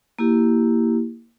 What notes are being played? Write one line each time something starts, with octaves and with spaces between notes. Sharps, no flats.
A#3 E4 G4